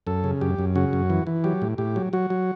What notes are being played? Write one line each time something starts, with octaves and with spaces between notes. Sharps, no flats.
F#2 A4
C#3
F#2 G4
F#2
C#3 F#4
F#2
E3
E3
F#3 G4
A2
A2 G4
F#3
F#3 F#4
F#3